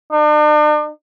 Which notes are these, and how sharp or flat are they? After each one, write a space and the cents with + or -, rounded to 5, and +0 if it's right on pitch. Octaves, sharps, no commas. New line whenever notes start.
D4 +45